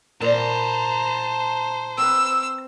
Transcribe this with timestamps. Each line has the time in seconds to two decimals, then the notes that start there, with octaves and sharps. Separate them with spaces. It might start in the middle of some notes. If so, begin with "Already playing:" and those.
0.22 A#2 C5 A5 A#5
1.98 C4 B4 E6